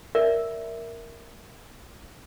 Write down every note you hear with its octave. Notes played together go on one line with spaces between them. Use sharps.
A#4 D5 E5